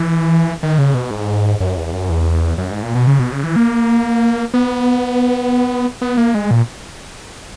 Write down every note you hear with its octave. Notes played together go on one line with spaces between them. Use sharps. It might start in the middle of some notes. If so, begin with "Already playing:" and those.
Already playing: E3
D#3
C#3
B2
G#2
F#2
E2
F#2
E2
F#2
G#2
A#2
B2
C#3
B2
C#3
E3
A#3
B3
B3
A#3
G#3
A#2